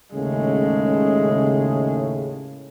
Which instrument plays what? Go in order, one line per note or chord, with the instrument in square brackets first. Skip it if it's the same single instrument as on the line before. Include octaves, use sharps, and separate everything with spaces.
[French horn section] D#2 A2 C#3 [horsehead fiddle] G#3